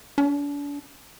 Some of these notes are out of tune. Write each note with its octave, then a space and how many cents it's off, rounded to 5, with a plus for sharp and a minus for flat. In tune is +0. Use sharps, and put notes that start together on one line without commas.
D4 -40